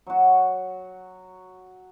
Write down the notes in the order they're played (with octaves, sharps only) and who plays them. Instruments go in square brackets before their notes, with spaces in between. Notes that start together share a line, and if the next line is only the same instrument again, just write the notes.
[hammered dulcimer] F#3 F#4